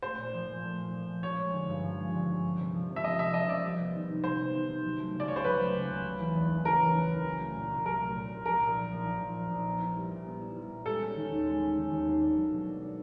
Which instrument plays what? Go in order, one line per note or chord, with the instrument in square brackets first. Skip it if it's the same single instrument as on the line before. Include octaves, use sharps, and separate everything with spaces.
[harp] A3 [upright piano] C5
[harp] A#2
F3
A#2
A3
A#2
F3
A#2
[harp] F3 [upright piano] C#5
[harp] G#3
D3
G2
F3
G#3
D3
G2
A#3
C3
F3
C3
[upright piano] E5
[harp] A#3 [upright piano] D#5
[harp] C3 [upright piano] E5
[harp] F3 [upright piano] D#5
[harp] C3 [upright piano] D5
[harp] G3
B3
D#3
C3
[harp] G3 [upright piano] C5
[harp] B3
D#3
C3
F#3
A3
C#3
[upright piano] D5
[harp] C#2 [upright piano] C#5
[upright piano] C5
[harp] F#3 [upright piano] B4
[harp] A3
C#3
C#2
C#3
E3
E2
F#1
[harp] C#3 [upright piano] A#4
[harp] E3
E2
F#1
F#3
A3
A#2
C2
[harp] F#3 [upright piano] A#4
[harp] A3
A#2
C2
[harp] F3 [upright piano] A#4
[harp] A#1
A#2
A#1
F3
A#1
A#2
A#1
B3
E4
G3
A#2
B3
E4
G3
A#2
[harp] G#3 [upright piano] A4
[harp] C#4
D#3
D#2
G#3
C#4
D#3
D#2
A#3
D4
F#3
B2
A#3
D4